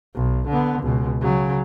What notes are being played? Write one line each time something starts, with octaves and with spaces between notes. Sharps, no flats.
B1
D3 B3
C#2 B2
C#3 F#3